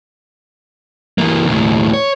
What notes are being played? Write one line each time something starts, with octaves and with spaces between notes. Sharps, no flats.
E3 A#3
D#2 A2
C#5